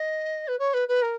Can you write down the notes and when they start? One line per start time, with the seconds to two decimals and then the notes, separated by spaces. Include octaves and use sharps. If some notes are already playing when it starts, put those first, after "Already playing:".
Already playing: D#5
0.47 B4
0.59 C#5
0.73 B4
0.88 B4
1.02 A#4